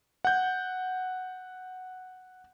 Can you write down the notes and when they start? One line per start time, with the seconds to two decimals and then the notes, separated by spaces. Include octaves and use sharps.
0.25 F#5 G6